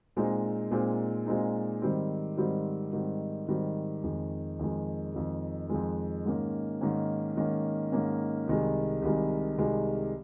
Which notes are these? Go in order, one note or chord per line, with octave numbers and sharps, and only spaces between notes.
A#2 G#3 C4 D#4
A#2 G#3 C4 D#4
A#2 G#3 C4 D#4
G#2 D#3 G3 C4
G#2 D#3 G3 C4
G#2 D#3 G3 C4
G#2 D#3 G3 C4
F2 D#3 G#3
F2 D#3 G#3
F2 D#3 G#3
F2 D#3 G#3
G#2 D#3 A#3 C#4
G#2 D#3 A#3 C#4
G#2 D#3 A#3 C#4
G#2 D#3 A#3 C#4
C2 C3 D#3 G#3
C2 C3 D#3 G#3
C2 C3 D#3 G#3